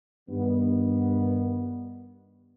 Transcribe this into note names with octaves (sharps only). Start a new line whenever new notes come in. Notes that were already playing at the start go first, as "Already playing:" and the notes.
G2 D#3 B3